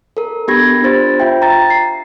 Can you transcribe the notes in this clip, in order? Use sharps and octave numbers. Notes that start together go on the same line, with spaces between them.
A4 A#4
B3 D4 G4 B5 G#6 A#6
D4 F4 C5 A6
F4 E5 G5
A#5 A6
C7